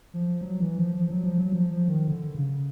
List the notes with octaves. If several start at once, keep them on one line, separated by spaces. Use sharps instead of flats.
F3
F#3
E3
F3
F3
F3
F#3
F3
F#3
F3
F3
D#3
D3
C#3